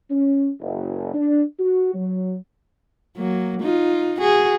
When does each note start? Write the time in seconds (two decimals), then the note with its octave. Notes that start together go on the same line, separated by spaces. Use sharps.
0.11 C#4
0.61 F#1
1.14 D4
1.59 F#4
1.94 F#3
3.17 F#3 A#3
3.61 D#4 F4
4.20 F#4 G#4